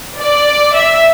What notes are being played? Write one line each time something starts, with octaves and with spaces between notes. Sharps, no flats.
D5
E5